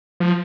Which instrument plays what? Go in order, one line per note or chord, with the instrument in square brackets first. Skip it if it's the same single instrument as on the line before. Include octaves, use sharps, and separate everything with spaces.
[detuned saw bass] F3